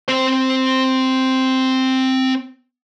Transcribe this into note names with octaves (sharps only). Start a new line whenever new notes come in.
C4 C5